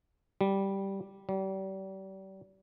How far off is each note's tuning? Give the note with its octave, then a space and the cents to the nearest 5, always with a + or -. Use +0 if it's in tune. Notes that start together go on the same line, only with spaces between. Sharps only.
G3 -5
G3 -35